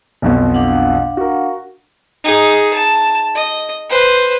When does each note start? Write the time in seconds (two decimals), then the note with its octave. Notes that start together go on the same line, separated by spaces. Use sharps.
0.22 B1 F2 B2
0.54 D4 F5 F#5
1.17 F#4 A#4
2.24 D#4 G#4
2.74 A5
3.35 D#5
3.90 B4 C5